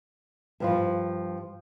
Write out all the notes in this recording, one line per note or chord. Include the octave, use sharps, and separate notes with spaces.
G2 F3 F4